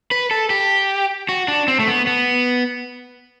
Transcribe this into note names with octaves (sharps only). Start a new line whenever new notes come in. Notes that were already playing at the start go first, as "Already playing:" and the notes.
B4
A4
G4
F#4
D4
C4
A3
B3
B3